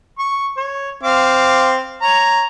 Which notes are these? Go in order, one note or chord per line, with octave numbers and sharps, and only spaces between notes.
C#6
C#5
C4 F5 D6
C#5 A#5